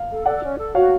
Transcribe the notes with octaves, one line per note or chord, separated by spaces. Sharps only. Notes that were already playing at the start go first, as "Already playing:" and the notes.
Already playing: F5
A4
A4 D5 F#5
C#4
A4
F#4 C#5 F5